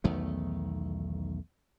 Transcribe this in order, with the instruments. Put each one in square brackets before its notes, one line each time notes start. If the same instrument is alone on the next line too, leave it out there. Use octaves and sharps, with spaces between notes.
[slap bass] B1 E2 D#3 A3